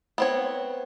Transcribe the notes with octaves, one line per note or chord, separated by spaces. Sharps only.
B3 C4 C#5